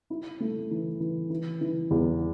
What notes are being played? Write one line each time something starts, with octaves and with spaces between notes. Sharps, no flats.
E4
A3
E3
E3
E3
E3
E2